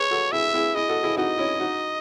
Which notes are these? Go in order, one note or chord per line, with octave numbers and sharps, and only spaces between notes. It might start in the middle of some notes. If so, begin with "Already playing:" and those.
Already playing: G#4 B4 C#5
F#4 A4
E4 G#4 E5
E4 G#4
E4 G#4 D#5
F#4 A4
E4 G#4
D#4 F#4 D#5
C#4 E4
D#4 F#4